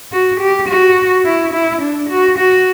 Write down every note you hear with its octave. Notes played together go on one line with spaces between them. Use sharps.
F#4
G4
F#4
E4
E4
D4
F#4
F#4